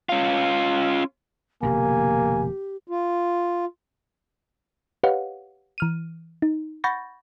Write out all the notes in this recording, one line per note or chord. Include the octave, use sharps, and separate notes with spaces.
C#4 F4
F1 B2 D3 A#3 G4 G#5
F4
G4 B4 C#5 D#5 F5 F#5
E3 F6 D#7
D#4
F#5 B5 C#6 G6 A6 A#6